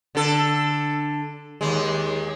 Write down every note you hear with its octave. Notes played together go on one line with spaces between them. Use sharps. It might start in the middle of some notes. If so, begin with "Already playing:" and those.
D3 A4
D#2 G#3